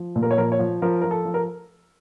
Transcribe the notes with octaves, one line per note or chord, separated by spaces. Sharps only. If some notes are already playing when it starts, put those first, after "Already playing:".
Already playing: F3
A#2
A#4
C#5
F3 A#4
C#5
F3
F3 A#4
F3 A#4
A4
F3
A#4